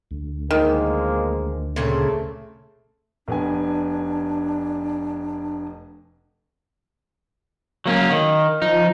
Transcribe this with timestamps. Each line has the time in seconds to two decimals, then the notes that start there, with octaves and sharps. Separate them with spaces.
0.11 D2
0.51 D#3 F3 G#3 A#3
1.76 A#2 C#3 A3 C4
3.28 F1 B3 D4 G#5
7.86 F#3 A#3 C#4
8.10 D#3
8.62 F3 D#4